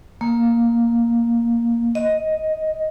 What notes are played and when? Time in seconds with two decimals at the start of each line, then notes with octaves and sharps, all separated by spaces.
0.21 A#3
1.95 D#5